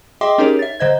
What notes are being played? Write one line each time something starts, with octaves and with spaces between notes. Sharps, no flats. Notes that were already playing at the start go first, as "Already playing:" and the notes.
G#4 D#5 E5 G5 C6 D6
C#4 D#4 G4 G#4 A#4 C#5
E5 A6
D3 C5 D#5 G#6